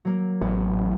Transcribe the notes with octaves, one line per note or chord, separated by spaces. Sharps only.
F#3 A#3
A1 B3